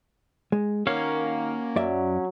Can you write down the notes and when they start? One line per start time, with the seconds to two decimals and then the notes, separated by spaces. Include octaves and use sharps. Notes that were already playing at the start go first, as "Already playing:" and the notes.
0.52 G#3
0.87 D#3 A#3 C#4 F#4 C#5 F5
1.76 F#2 F#3 D5 E5